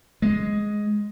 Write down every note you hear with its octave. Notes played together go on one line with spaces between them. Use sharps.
G#3